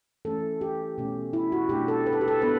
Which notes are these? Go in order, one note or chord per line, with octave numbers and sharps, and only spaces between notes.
E3 A3 C#4 A4
G4
B2 A3 C#4
E4
F#4
B2 A3 D4 G4
A4
B4
A4
G4
A4
B3 D4 B4